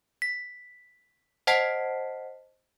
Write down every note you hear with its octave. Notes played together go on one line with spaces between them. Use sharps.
B6
C5 D#5 F#5 A5 B6 C7